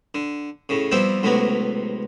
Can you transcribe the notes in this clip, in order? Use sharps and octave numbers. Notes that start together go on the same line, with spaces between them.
D3
A2 C#3
F3 G3 B3 C4 E4 F4
C#2 A2 C3 F#3 B3